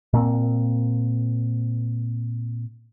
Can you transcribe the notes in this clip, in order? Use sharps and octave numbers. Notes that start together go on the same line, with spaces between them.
A#2 A#3 C4